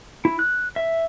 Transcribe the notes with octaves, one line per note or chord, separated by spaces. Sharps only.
E4
F#6
E5